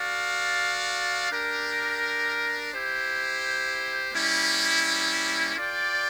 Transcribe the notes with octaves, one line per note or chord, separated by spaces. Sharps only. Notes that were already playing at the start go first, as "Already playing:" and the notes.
Already playing: F#4 A4 D5 F5
D4 G4 A#4
E4 G4 C5
G3 A#3 C#4 E4
F4 A4 D5 G5